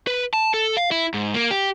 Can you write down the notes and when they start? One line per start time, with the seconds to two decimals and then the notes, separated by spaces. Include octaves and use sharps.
0.07 B4
0.33 A5
0.54 A4
0.77 F5
0.91 E4
1.14 G#2
1.34 A#3
1.51 G4